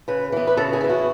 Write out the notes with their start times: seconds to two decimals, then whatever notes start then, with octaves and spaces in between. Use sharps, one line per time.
0.08 C#3 B4
0.32 E3 B3
0.47 B4
0.57 C#3 A4
0.73 G#4
0.81 E3 B3
0.90 F#4